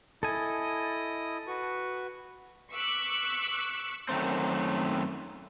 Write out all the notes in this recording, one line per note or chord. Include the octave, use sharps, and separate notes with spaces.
E4 A4 D#5 G#5 D#6
F#4 B4 C#6
C#6 D6 E6 F#6 B6
F#2 D#3 A3 C4